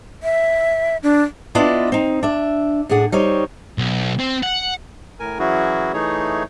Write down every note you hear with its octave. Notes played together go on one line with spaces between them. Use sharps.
E5
D4
B3 D4 E4 F4 D5 D#5
C4 D#4
D4 E5
A2 D4 G#4 F#5
G3 D#4 C5 C#5
B1
C4
F#5
A2 A#4 G#5
E3 F#3 C#4 E4 F#4 G#4
E3 A3 D#4 G#4 C#5